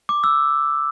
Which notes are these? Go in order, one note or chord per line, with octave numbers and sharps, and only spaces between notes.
D6
E6